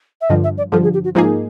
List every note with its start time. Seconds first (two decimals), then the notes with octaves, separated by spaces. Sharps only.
0.21 E5
0.29 G2 D3 F3 D#5
0.44 E5
0.58 D5
0.72 G2 D3 F3 A4
0.84 G#4
0.94 G4
1.04 F#4
1.15 G#2 F3 A#3 D#4 F4 G#4